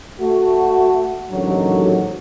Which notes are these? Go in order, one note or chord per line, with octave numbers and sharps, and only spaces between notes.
A3 F#4
A1 D#2 G#2 D3 F#3